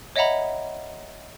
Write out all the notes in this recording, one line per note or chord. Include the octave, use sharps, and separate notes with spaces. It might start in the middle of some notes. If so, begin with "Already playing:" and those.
C#5 D#5 E5 F#5 A#5 B5